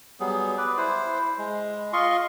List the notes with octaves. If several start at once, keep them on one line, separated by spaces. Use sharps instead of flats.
F#3 G3 B3 G#4
B4 D5
E4 C5
G#3
F4 D#5 C6 C#6